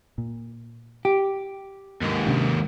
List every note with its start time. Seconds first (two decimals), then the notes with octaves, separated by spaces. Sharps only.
0.18 A#2
1.05 G4
2.01 D#2 G#2
2.27 C3 C#4 D4